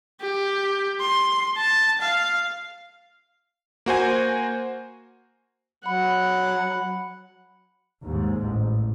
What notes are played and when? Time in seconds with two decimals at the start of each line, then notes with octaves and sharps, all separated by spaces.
0.21 G4
1.00 C6
1.57 A5
2.01 F5
3.86 A#3 F#4 C5 G#5
5.86 F#3 F#5 B5
8.04 D#2 G#2
8.43 A1